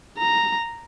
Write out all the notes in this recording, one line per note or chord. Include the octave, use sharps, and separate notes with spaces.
A#5